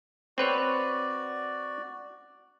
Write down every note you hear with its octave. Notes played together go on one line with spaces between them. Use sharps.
C4 F#4 B4 C#5 D5